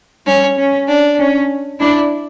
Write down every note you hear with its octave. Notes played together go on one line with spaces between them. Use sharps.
G3 C#4
C#4
D4
C#4
D4 E4